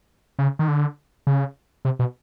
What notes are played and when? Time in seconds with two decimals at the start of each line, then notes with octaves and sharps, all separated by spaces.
0.39 C#3
0.59 D#3
0.68 D3
1.27 C#3
1.85 C3
1.99 B2